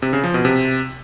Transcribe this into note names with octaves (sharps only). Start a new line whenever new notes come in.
C3
C#3
F3
B2
C3